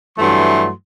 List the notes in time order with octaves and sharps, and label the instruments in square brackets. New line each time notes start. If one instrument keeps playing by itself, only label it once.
[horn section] G2 E3 F#3 A3 C6